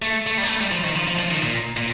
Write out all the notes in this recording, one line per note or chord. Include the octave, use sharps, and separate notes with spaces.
A3
A3
G3
A#3
A3
G3
F3
D#3
F3
F3
F3
D#3
A#2
A#2